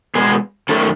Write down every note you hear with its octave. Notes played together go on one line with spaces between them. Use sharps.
B2 G#3 B3 G#4
F#2 D#3 A3 C#4 A4